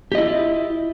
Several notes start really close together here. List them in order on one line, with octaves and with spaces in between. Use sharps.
G4 D#5 E4 F4